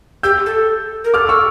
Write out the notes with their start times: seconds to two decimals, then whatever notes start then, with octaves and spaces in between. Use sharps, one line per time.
0.23 G4 E6 G6
0.46 A4
1.04 A#4
1.14 A4 D6 F6
1.29 C#6 E6